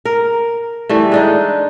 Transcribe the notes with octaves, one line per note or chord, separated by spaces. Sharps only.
A#4
E3 G3 A3
G#3 D4 D#4